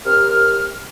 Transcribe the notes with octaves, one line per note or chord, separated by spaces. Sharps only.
D#2 C3 A#4 F6